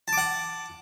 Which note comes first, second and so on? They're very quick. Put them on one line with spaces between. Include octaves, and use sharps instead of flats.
A5 D6 F#5